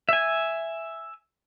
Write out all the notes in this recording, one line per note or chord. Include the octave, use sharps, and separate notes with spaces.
E5 G#5